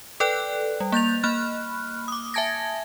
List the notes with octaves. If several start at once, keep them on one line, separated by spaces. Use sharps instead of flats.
A4 B4 D5 G5 F#6
G3
A#3 G6 A6 F7
A#3 B5 F6 F#6
D6 D#6
E5 G#5 A5 G#6 A#6